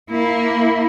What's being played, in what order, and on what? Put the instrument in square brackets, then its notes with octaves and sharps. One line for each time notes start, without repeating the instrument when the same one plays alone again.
[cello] A#3 E4